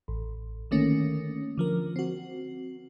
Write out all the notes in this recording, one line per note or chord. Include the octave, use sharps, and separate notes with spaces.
A1
D3 D#3 A3 A#3 C#4
D3 F3 A#4
C4 F#4